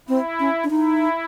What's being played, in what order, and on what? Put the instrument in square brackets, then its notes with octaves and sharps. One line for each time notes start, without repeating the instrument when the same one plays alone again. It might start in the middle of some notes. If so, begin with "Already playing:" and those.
[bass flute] C4 [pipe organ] E4
[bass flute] C#4
D4
[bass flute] D#4 [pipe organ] E4